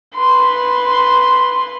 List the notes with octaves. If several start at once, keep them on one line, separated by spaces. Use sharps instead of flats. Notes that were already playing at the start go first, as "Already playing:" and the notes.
B4 C6